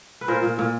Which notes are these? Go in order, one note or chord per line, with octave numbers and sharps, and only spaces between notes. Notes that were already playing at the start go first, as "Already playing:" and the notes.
B4
A#2 A#4 C5
A#2
A#2